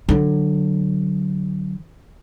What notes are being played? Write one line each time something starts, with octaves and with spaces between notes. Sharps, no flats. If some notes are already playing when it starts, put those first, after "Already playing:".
D3 F#3